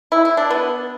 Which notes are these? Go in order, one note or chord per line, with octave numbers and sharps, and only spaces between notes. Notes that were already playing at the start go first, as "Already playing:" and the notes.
E4
E4
D4
B3